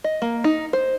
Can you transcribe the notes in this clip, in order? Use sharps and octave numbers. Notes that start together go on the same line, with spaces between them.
D#5
A#3
D#4
C5